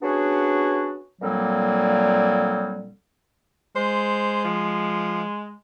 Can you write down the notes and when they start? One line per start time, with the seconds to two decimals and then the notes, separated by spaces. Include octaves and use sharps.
0.02 B3 C#4 D4 F#4 G#4
1.21 A#2 D3 F#3 G3 A#3 C4
3.76 G#3 C5
4.45 F3